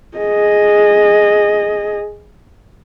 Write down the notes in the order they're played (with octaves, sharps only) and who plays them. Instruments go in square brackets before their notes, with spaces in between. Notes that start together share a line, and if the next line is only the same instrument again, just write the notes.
[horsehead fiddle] G#4 D#5